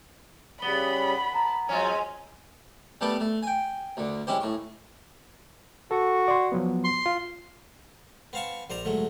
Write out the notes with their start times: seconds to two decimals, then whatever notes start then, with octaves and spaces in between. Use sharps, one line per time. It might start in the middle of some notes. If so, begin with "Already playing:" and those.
0.62 C#3 G3 B3 B5 G7
1.35 A5 A#5
1.69 F#3 G#3 C4 C#4 F4 G#5
3.01 G3 A3 B3 G4 A4
3.20 A3
3.43 G5 G#5
3.97 D2 D3
4.27 G#3 C#4 E4 G4 C5
4.41 A2 C#6
5.91 F#4 A4
6.28 D5 C6
6.52 F3 F#3 B3
6.84 C6
7.06 F4
8.33 B3 C4 F5 A5 C#6
8.70 A#1 C5 D5 A#5
8.85 D2 G#2 F#3 A3